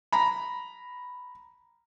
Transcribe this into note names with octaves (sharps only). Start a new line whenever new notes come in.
A#5 B5